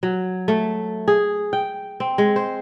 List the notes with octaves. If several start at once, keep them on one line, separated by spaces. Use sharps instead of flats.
F#3
A3
G#4
G5
C4
G#3
C5